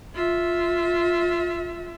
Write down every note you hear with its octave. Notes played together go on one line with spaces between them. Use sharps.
F4 E5